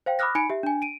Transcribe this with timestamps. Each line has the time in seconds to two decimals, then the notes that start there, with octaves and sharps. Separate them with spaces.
0.06 C5 F5 G5
0.19 B5 D6 D#6 F6 F#6 A#6
0.35 D#4 G#5 B5 C#7 D7
0.50 G4 E5
0.63 D4 G#5
0.82 D7 D#7